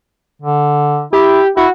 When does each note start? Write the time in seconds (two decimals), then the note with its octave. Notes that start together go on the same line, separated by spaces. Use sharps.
0.42 D3
1.13 E4 G4
1.57 E4 F#4